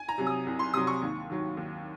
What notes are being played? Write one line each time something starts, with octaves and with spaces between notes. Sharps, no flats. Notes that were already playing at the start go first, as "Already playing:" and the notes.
Already playing: G#5
A#5
C3 F#3
D#6
C2
C6
C3 F#3 D#6
C#6
D#2
D#3 F#3
D#2